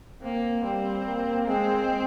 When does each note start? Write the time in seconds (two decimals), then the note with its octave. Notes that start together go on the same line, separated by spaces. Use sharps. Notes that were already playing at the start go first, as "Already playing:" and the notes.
0.22 A#3 C4
0.63 G3 C4
1.05 A#3
1.46 G#3 C4